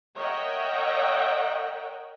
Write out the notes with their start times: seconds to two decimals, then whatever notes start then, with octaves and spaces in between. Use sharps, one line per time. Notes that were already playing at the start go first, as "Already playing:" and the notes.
0.16 A#4 C#5 D#5 E5 F#5 G5